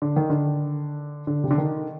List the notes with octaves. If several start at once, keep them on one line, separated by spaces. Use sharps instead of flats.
D3
D#3
D3
D3
C3
D3
D#3